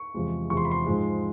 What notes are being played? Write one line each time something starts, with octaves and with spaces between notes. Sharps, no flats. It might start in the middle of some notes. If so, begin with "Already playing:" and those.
Already playing: C#6
E2 C3 F3 G#3
E2 C3 F3 G#3 C#6
C6
B5
C6
G#2 F3 G#3